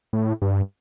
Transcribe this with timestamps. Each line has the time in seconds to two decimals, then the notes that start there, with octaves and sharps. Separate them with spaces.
0.13 A2
0.42 G2